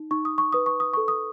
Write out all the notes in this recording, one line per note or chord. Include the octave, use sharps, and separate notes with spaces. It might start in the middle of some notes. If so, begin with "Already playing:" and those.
Already playing: D#4
D#4 C#6
D#6
C#6
B4 D#6
C#6
D#6
A4 C#6
D#6